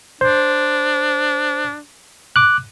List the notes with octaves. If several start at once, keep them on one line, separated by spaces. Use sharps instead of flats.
D4 C5
D6 F#6